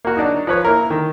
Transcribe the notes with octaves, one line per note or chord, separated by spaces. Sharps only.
A#3 F#4
F#3 D4 D#4
F3 B4 C#5
A#3 E4 A#4
D#3